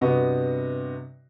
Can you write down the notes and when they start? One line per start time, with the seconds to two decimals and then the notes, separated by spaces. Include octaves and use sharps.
0.01 G2 C3 B3 F#4 D#5 C#6